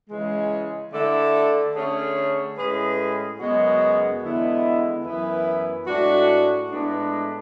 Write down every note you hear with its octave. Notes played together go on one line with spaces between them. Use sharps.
C#3 E3 G#3
D3 A3 E4 A4 D5
D3 A3 C#4 G#4 C#5
A2 G#3 C#4 G#4 B4
F#2 C#3 G#3 B3 F#4
E2 D3 G#3 B3 E4
F#2 E3 B3 E4 B4
A2 G#3 D4 F#4
A2 G#3 B3 D4